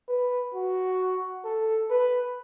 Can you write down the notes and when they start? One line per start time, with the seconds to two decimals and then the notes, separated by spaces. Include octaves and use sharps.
0.08 B4
0.54 F#4
1.45 A4
1.90 B4